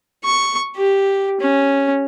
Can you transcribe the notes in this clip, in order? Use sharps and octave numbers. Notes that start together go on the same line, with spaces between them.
C#6
G4
C#4